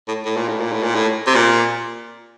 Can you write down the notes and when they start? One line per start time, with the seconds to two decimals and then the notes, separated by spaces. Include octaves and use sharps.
0.08 A2
0.25 A2
0.36 A#2
0.48 A2
0.60 A#2
0.72 A2
0.83 A#2
0.95 A2
1.27 C3
1.35 A#2